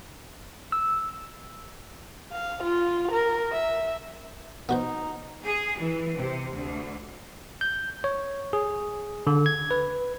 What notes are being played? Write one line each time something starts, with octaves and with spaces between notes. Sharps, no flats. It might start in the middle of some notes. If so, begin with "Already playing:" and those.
E6
F5
F4
A#4
E5
B3 D#4 F#4 C5
G#4
E3
C3
D2
G6
C#5
G#4
D3
G#6
B4